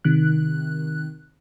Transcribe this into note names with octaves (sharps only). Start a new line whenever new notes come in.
C3 D#3 F#6